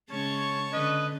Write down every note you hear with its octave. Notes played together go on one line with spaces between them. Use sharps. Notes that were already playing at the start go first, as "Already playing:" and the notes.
C#3 G#3 C#4 C#5 A5 C#6
D3 C#4 B4 D#5